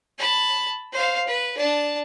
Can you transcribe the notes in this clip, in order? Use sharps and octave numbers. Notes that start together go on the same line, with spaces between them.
A5 B5
C5 F5
B4
D4 A5